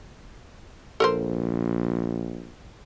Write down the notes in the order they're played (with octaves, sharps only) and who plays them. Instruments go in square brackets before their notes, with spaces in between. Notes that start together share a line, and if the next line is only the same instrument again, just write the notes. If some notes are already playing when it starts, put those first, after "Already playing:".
[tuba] A#1 [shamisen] A4 A#4 C5